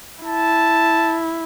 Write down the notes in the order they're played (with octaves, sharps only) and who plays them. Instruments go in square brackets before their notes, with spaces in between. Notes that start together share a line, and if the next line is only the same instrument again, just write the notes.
[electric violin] E4 [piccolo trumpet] A5